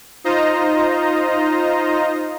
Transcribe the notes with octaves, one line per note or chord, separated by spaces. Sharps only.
D#4 F4 C5 D#5 A#5